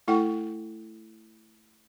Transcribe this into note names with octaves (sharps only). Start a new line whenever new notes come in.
A3 E4 A4 F#5 G5 C#6